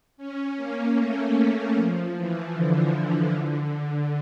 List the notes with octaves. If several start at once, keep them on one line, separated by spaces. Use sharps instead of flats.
C#4
A#3
A3
F3
E3
D3
D3
D3